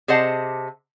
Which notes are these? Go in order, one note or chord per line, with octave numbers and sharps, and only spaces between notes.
C3 G#4 C5 D#5 F#5 A5